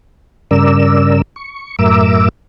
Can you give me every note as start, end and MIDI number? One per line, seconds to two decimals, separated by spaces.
0.51 1.22 43
0.51 1.22 49
0.51 1.22 70
0.51 1.22 74
0.51 1.22 88
1.36 1.76 85
1.79 2.29 42
1.79 2.29 45
1.79 2.29 70
1.79 2.29 76
1.79 2.29 86
1.79 2.29 88